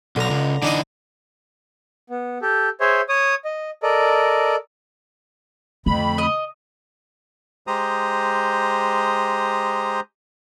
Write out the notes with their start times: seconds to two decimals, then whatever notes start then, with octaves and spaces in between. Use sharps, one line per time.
0.16 B1 D3 A#5
0.30 C#2
0.62 D3 E3 D4 D#4 D#5
2.10 B3
2.42 G4 A4
2.80 G#4 C5 C#5 E5
3.09 C#5 D#6
3.45 D#5
3.83 A4 A#4 D5 D#5
5.86 F2 D3 A3 B5
6.18 D#5
7.67 G#3 G4 C5 A#5 D#6